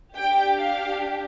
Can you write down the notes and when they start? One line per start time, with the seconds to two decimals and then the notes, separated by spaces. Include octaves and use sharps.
0.17 D4 G4 G5
0.59 F5